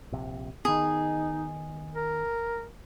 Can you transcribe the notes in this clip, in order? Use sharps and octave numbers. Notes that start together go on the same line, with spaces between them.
A#1 C3
D#3 B3 D#4 G#4
A#4